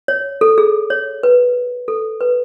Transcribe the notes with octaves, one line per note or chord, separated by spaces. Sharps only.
C#5
A4
G#4
C#5
B4
A4
B4